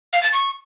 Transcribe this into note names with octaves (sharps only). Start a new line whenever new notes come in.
F5
A6
C#6